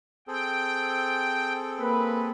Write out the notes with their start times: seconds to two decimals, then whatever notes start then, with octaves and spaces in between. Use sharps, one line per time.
0.28 C4 G#4 A4 G5
1.79 A#3 B4